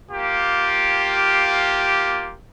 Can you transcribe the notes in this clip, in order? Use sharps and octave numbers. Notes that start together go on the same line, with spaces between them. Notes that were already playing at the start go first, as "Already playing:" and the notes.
A#3 F4 G4